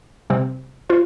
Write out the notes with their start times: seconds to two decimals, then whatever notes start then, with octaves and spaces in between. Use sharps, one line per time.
0.30 C3 G3 C4
0.90 F4 C5